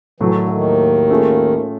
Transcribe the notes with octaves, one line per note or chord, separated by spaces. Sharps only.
A2 E3 F#3 A3
D#3
D3
D#2 D#3
A3 C#4 F4 G#4